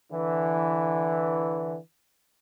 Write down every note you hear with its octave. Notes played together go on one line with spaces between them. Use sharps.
D3 E3